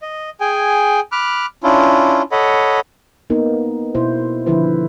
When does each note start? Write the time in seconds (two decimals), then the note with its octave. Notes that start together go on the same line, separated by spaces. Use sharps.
0.02 D#5
0.40 G#4 G5 G#5
1.12 B5 D6 F6 F#6
1.63 C#4 D4 E4 F4
2.32 A4 C#5 D#5 F#5 B5
3.30 A#3 B3 D#4 A#4
3.95 B2 E4 C5
4.46 D3 D#3 F3 E4 B4 C5